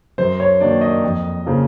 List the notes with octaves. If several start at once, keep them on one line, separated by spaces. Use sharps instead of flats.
F#2 C5
C#5
D#3 F#3 A#3 D4 D5
D#5
F2
C#3 F3 A#3